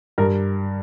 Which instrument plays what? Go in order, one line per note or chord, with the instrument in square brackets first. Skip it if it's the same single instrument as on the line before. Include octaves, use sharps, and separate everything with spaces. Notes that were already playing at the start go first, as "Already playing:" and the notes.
[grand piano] G2 A#4